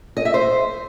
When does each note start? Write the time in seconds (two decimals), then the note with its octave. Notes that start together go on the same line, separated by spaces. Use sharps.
0.17 D#5
0.25 E5
0.34 C5